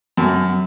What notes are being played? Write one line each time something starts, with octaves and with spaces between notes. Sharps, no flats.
F#2